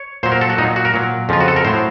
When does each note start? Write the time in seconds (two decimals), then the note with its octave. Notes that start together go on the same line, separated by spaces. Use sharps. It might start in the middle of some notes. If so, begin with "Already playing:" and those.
Already playing: C#5
0.23 A#2 F#3 C5
0.32 A#4
0.41 A4
0.50 F#4
0.58 A#2 D#4
0.63 F#3
0.76 F#4
0.85 A#4
0.94 A#2 F#3
1.29 F2 C#3 F3 F4
1.40 F#4
1.48 A4
1.56 A#4
1.65 A2 F#3 C5